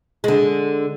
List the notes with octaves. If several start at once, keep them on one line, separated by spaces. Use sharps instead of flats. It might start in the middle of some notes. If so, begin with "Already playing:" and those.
D3 G#3